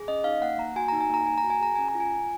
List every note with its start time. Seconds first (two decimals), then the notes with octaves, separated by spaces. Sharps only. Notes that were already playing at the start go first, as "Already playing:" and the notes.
Already playing: G#4
0.08 C#4 D#5
0.24 D#4 F5
0.42 A#3 F#5
0.58 A#3 A#5
0.76 F#4 G#5
0.88 D#4 A#5
1.01 G#5
1.10 A#3 A#5
1.26 A#3 G#5
1.38 A#5
1.43 F#4
1.50 G#5
1.60 G#4 A#5
1.75 C#4 G#5
1.88 A#5
1.95 F4
2.00 G#5
2.12 F4